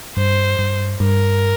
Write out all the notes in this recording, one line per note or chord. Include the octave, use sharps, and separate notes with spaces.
G2 C5
G2
G2 A#4